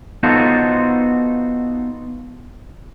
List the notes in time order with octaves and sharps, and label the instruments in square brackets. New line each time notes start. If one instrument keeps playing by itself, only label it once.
[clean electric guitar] B3 D#4 F4 F#4 A4 C5